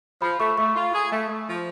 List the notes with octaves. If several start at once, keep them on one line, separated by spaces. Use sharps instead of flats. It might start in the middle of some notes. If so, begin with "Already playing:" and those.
F3 B5
A3 C#6
A3 C#6
F4
G#4
A3
A3
F3